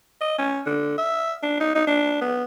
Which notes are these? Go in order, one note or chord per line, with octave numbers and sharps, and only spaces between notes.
D#5
C#4
D3
E5
D4
D#4
D#4
D4
B3